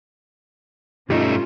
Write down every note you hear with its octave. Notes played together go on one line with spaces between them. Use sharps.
G2 G3 A3 C#4 D#4 F4